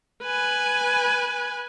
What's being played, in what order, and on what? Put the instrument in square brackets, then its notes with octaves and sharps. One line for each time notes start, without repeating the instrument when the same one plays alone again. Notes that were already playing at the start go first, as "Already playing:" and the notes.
[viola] B4 G#5